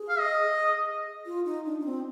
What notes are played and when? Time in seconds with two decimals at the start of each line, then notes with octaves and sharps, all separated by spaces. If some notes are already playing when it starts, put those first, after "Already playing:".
Already playing: G#4
0.09 F5
0.19 D#5
1.26 F4
1.45 D#4
1.66 D4
1.80 D4
1.85 C4